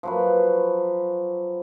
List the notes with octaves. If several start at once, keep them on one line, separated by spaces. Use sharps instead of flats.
F3 F#3 B4